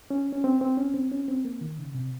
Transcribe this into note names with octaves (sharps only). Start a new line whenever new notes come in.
C#4
C#4
C4
C4
C#4
C4
C#4
C4
A#3
D#3
C#3
C3